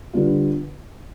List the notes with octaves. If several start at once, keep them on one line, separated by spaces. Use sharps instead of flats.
D3 G3 B3 D4 F4